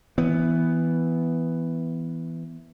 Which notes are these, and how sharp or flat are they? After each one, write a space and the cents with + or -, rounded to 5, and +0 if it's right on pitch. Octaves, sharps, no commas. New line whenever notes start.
E3 +0 B3 +5